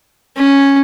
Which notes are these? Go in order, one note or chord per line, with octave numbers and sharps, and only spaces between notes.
C#4